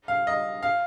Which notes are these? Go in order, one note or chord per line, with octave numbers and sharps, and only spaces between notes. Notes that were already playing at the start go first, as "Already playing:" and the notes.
F5
D#5
F5